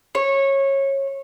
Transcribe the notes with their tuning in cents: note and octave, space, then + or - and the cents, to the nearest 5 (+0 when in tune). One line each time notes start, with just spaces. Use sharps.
C#5 -20